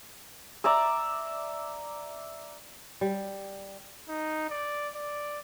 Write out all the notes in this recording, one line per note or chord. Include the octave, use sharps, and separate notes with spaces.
D5 E5 A#5 E6
G3
D#4
D5
D5